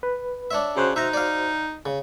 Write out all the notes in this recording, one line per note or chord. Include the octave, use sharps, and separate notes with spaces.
B4
D4 C#5 E5
C#3 F#4 C5 F#6
D#4 E5 A#5
D5 F5
C#3